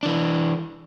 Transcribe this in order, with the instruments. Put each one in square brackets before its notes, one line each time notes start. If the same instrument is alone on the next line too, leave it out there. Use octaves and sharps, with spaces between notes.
[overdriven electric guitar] E3 D4